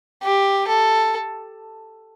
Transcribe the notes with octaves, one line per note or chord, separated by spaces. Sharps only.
G4
A4